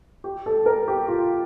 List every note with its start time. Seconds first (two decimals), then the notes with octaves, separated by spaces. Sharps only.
0.24 G4
0.46 A4
0.66 A#4
0.88 G4
1.08 F4